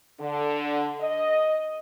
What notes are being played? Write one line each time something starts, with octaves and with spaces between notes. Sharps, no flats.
D3
D#5